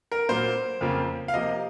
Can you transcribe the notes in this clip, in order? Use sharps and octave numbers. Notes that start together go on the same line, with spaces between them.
A#4
A#2 F#3 A#3 C5
F2 C#3 F3 A#3
F5
C3 F3 A#3 D#5